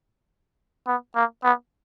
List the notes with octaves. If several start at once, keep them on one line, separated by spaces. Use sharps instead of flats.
B3
A#3
B3